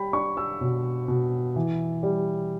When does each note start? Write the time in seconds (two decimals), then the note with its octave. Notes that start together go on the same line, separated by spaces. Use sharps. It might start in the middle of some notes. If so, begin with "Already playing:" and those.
Already playing: G3 G5 B5
0.13 D4 C#6
0.37 E6
0.61 B2
1.08 B2
1.56 E3
2.03 G3